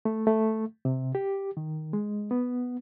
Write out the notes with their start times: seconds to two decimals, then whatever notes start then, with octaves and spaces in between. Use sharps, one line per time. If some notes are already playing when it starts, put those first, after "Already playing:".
0.05 A3
0.27 A3
0.85 C3
1.15 G4
1.57 D#3
1.93 G#3
2.31 B3